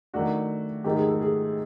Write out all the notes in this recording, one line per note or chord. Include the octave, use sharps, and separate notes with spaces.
D#3 F#3 A3 D4 F#4
G#2 D#3 F#3 A3 G4
G#4
A4
G#4